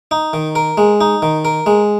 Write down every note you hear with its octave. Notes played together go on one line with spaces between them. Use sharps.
D#4
D#3
A#4
G#3
D#4
D#3
A#4
G#3